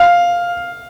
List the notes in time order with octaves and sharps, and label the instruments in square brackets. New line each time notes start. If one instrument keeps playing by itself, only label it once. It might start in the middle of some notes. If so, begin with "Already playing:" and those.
Already playing: [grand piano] F5